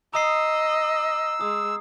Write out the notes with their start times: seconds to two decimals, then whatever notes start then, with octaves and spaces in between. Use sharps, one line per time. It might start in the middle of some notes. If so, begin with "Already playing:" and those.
0.14 D#5 A#5 D#6 E6 C7
1.41 G#3 D#6